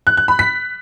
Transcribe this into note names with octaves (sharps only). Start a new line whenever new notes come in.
F#6
F#6
B5
B6